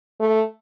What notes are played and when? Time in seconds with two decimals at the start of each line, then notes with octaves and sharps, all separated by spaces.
0.20 A3